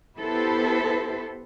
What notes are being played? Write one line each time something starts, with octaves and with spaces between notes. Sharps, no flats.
B3 E4 G4 A4 B4 C5